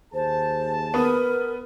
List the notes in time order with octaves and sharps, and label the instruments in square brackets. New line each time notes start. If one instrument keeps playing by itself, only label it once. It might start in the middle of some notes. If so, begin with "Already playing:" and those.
[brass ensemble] D#2 G#4 A5 [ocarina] C5
[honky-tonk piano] B3 B5 D#6 [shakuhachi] A#4 [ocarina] B4